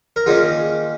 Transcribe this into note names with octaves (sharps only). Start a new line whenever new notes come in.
A#4
D#3 A#3 C#4 F4 G#4